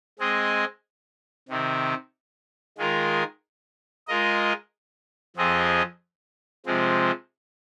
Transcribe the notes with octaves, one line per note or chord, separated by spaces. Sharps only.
G#3 C4 G#4 D#5
C3 D#3 C4
D#3 G#3 F4 A#4
G#3 F4 A#4 D#5
F2 F3 C4 G#4 D#5
C3 F3 G#3 C4